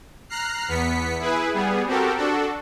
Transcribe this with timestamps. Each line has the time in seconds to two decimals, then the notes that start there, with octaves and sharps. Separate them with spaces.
0.29 A#5 F6 F#6 C7
0.68 E2 B3 B6 C#7
1.20 E4 G#4 B4
1.54 G3 B3 G#4
1.86 C4 F#4 G4 A4 A#4
2.17 D4 F#4 A4